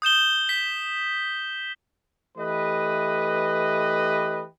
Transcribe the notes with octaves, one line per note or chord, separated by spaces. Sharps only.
D#6 G6 E7 G7
B6
E3 A3 G4 B4 D#5